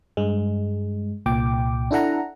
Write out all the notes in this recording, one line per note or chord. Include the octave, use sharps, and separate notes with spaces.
G2 G#3
C2 A#2 G5 D6
D4 E4 A4 F#5 A#5